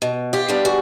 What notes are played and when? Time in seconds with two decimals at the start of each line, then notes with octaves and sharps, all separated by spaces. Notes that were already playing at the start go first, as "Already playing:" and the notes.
0.02 B2
0.33 F4 G4
0.48 G3 B3 D4 F4
0.65 F#4 G#4